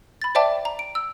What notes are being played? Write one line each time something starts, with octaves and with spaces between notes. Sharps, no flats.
B5 A6
C5 D5 E5 G5 A5 D6
A#5
D7
E6